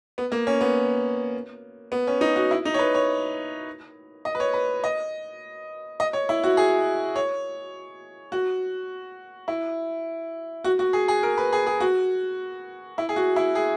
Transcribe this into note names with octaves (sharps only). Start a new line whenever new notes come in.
B3
A#3
C#4
B3
B3
C#4
D#4
F#4
E4
D#4
C#5
B4
C#5
D#5
B4
C#5
B4
D#5
D#5
C#5
E4
F#4
G#4
C#5
F#4
E4
F#4
F#4
G#4
G#4
A#4
B4
G#4
G#4
F#4
E4
G#4
F#4
E4
G#4